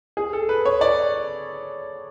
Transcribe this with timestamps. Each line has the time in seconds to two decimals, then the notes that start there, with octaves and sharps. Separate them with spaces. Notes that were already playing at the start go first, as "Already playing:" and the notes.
0.17 G#4
0.33 A4
0.49 B4
0.65 C#5
0.81 D5